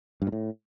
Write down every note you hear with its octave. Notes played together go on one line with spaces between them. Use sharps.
G2
A#2
A2